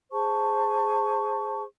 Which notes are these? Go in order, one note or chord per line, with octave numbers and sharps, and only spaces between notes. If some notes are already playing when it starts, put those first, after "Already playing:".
G#4 C5 A5 C#6